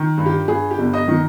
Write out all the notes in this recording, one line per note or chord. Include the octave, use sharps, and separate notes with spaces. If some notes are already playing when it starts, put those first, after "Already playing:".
Already playing: D#3
G2
G4
G2 G#4
G4
G1
D#5
D#3